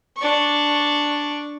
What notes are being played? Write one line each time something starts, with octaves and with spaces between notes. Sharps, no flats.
D4 C#6